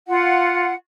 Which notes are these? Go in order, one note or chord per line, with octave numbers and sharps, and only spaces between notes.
F4 F#5